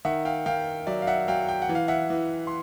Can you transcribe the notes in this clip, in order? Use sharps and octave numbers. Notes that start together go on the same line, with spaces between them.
D#3 E5 F#5
F5 G5
D#3 F5 G5
F#3 D5 E5
F5
E5 F#5
F#3 F5 G5
G5
F#5
E3
F5
E5 F#5
E3
C6